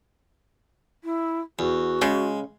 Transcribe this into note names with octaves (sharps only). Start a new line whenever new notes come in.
E4
E2 F#4
C#3 G#3